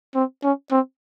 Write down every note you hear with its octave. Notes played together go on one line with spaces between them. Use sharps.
C4
C#4
C4